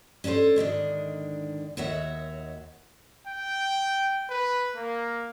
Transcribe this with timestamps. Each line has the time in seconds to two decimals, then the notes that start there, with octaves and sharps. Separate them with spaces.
0.24 C#4 D4 E4 A4 C5
0.56 G#2 D3 D#3 D4
1.77 D#2 D#3 F#4 C#5 E5 F#5
3.27 G5
4.30 B4
4.76 A#3